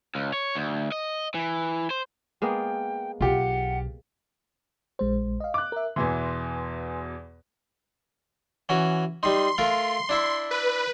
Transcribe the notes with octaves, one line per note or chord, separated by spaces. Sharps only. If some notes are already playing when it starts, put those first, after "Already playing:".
C#2
C#5
D2
D#5
E3
C5
G#3 A#3 B3 G5
B1 F4 G4 F#5
A#1 G#3 C5
D#5 F5
D6 F#6
A#4 E5
E2 B2 E3 B4 G#5 C6
E3 C#4 F#4
G3 D#4 C6
A3 F4 A#4
D4 E4 E5
B4